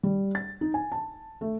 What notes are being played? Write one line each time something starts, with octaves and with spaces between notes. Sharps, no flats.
G3
A6
D#4
G#5
A5
A3